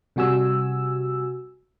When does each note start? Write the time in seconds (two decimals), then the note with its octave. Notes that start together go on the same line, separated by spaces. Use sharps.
0.16 C3 G3 F#4 G#5 E6